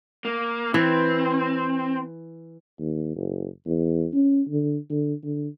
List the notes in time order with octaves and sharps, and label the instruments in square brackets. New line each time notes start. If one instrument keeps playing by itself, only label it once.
[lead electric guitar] A#3
[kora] E3 [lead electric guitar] C4
[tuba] D#2
F#1
E2
C#4
D3
D3
D3